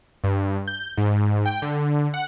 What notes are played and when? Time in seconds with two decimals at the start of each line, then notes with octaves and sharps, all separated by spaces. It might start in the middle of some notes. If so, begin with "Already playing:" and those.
0.24 G2
0.67 G6
0.98 G#2
1.46 G5
1.62 D3
2.14 F#5